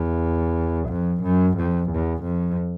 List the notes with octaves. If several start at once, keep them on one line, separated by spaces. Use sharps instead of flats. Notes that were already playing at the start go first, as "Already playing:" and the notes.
Already playing: E2
F2
F#2
F2
E2
F2